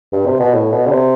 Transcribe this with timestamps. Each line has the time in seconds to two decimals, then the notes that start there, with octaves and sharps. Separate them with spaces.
0.13 G2
0.26 C3
0.40 B2
0.53 A2
0.72 B2
0.87 D3
0.91 C3